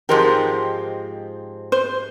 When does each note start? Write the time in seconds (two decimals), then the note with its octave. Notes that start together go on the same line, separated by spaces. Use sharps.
0.09 G#2 F3 G#3 C4 G4 A#4
1.72 C5